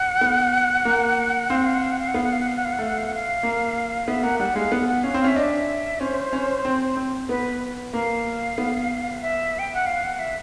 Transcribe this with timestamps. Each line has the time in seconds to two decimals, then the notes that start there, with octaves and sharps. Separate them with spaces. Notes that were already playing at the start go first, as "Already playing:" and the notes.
Already playing: F#5
0.21 B3
0.85 A#3
1.50 C4 F5
1.58 F#5
1.66 F5
1.74 F#5
1.83 F5
1.91 F#5
1.99 F5
2.08 F#5
2.14 B3 F5
2.24 F#5
2.32 F5
2.40 F#5
2.48 F5
2.56 F#5
2.65 F5
2.73 F#5
2.79 A3 F5
2.89 F#5
2.98 F5
3.07 F#5
3.14 F5
3.43 A#3
4.08 B3 E5
4.23 A#3 F#5
4.40 G3 F#5
4.56 G#3 F5
4.72 B3 F#5
4.88 F#5
5.04 C#4 F5
5.14 C4
5.20 F5
5.24 C#4 E5
5.36 D4 D#5
5.44 E5
6.00 C#4 C5
6.33 C#4
6.65 C4
6.97 C4
7.29 B3 B4
7.93 A#3 F5
8.58 B3
9.22 E5
9.59 G5
9.74 F#5
9.86 F5
10.04 F#5
10.19 E5